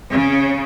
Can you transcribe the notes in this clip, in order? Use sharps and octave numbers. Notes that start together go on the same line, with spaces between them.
C#3